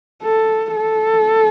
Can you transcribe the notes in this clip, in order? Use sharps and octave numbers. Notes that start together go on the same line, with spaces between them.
A4
A4